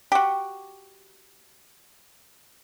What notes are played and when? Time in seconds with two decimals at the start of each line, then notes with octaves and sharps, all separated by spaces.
0.12 F#4 G4